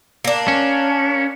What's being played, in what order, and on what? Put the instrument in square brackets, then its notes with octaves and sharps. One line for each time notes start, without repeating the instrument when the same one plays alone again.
[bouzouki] A#3 D4
[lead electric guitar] C#4